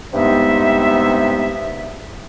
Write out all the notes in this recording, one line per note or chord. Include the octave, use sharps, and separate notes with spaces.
G2 C3 G#3 B3 D#4 E5